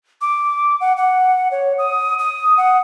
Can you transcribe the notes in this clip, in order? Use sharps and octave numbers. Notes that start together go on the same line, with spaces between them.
D6
F#5
F#5
C#5
D#6
D#6
F#5